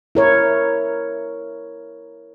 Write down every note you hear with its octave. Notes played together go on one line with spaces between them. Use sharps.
E4 A#4 C#5